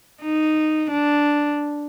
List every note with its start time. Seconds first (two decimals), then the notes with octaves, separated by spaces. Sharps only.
0.22 D#4
0.91 D4